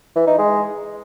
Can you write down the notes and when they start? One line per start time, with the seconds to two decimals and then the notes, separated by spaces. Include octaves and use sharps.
0.16 E3
0.27 D#4
0.38 G#3